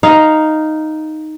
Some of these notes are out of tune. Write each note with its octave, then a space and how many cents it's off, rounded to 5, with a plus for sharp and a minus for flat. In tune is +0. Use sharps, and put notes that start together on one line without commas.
D#4 +0 F5 +0